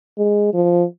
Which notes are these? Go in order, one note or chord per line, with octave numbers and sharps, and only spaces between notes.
G#3
F3